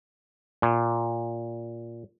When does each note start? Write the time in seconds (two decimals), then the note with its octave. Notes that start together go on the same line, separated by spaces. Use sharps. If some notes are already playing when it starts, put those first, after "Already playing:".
0.62 A#2